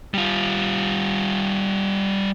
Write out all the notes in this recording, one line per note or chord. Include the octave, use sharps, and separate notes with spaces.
G3 F4